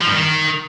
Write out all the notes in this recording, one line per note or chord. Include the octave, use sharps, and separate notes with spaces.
F3
G2
D#3